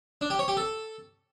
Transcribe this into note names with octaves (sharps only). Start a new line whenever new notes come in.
D4
G4
C#5
G4
A4